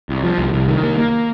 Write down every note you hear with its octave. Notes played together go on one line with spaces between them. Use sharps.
C2
F3
C2
C2
D#3
A#3
A#3